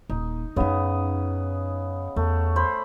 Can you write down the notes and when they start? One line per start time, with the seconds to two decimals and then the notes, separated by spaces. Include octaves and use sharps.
0.10 D#1 D#4
0.56 F#2 C#3 B3 D#4 D#5
2.16 E2 A3
2.56 C5 B5